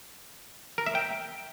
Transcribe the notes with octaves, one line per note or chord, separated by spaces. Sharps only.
A#4
E5
G5